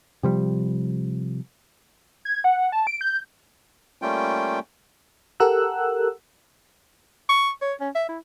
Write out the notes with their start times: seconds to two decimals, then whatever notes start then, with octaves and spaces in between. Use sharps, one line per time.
0.23 C3 F3 G3
2.25 G#6
2.44 F#5
2.72 A5
2.87 D7
3.01 G6
4.02 G3 A3 A#3 C#4 F4 G5
5.40 G4 A4 A#4 F#5 E6 F#6
7.29 C#6
7.62 C#5
7.81 C#4
7.95 E5
8.09 E4